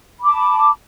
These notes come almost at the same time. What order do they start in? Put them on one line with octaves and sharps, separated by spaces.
B5 D6 A5